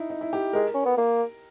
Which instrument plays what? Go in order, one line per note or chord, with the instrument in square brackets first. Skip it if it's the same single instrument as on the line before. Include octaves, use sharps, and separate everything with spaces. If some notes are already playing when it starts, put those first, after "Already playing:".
Already playing: [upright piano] D#4 E4
D#4
E4
G4
[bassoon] G#3 [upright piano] A#4
[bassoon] C#4
B3
A#3